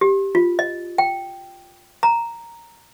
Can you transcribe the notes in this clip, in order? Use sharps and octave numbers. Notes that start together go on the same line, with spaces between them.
G4
F4
D#5
G5
A#5